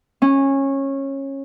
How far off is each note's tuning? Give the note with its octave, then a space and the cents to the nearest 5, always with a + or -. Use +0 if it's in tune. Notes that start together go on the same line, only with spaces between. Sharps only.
C#4 -20